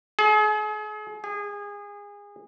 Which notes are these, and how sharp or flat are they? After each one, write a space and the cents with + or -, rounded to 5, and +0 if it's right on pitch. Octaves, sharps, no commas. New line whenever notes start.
G#4 +40
G#4 -25